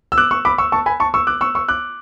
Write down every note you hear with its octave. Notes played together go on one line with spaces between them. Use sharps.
E6
D6 F#6
C#6 E6
B5 D6
C#6 E6
A5 C#6
G#5 B5
A5 C#6
C#6 E6
D6 F#6
C#6 E6
C#6 E6
D6 F#6